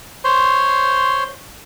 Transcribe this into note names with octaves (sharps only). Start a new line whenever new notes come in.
C5 C#5 C6